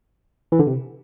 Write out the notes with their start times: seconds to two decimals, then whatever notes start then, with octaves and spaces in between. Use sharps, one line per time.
0.52 E3
0.59 D3
0.67 C3